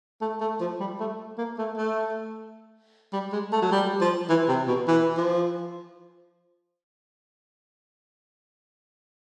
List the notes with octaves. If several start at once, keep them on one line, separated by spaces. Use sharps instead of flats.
A3
A3
F3
G3
A3
A#3
A3
A3
G3
G#3
A3
F#3
G3
F3
E3
C3
B2
E3
F3